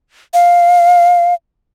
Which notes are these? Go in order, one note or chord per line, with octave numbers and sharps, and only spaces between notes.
F5